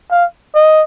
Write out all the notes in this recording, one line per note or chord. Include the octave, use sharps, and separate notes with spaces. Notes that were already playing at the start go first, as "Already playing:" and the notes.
F5
D#5